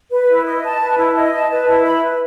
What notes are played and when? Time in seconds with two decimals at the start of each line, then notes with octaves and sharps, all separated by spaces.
0.11 B4
0.28 E4
0.45 D#5
0.63 A5
0.80 B4
0.98 E4
1.16 D#5
1.33 A5
1.50 B4
1.68 E4
1.85 B5
2.03 B4